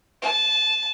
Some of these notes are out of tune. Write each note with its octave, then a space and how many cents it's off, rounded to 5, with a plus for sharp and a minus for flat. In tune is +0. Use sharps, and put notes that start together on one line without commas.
A5 -20